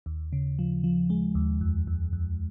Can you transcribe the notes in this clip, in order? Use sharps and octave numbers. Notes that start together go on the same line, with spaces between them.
D#2
C#3
F3
F3
G#3
D#2
F2
F2
F2